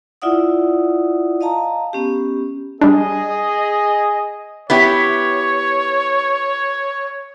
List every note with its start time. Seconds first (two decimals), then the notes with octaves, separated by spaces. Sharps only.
0.22 E4 F4 D5 E5 F#5 D#6
1.41 D#5 F5 A5 A#5
1.93 B3 C#4 G4
2.81 G3 D4 G#4 D#5
4.70 B3 E4 G4 C#5